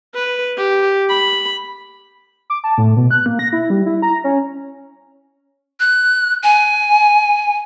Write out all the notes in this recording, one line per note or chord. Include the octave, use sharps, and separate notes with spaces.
B4
G4
B5
D6
A5
A2
B2
F#6
A#3
A#6
E4
G3
E4
A#5
C#4
F#6
G#5